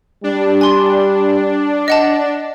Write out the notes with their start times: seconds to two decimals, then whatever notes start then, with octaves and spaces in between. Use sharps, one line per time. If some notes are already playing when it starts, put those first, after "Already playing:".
0.24 G3 D4
0.61 G#5 C6
1.88 D#5 F#5 A5